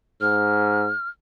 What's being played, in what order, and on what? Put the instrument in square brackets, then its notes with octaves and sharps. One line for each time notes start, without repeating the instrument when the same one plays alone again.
[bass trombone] G#2 [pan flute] F6